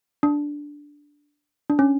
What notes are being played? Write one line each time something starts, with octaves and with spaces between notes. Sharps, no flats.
D4
D4
C#4